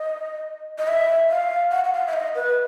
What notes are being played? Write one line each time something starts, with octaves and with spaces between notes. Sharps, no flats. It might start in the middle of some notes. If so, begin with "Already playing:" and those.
Already playing: D#5
D#5
E5
F5
F#5
F#5
F5
E5
D#5
B4